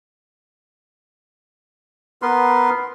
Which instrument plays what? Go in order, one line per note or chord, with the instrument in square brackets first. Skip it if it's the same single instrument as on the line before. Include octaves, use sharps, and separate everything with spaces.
[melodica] B3 A#4 B4 C6